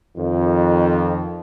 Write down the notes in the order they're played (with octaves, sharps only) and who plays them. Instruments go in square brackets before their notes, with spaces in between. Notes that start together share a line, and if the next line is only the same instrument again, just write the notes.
[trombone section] F2 D#3